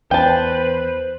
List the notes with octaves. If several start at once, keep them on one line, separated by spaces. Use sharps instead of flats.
E2 B4 C5 G5 A5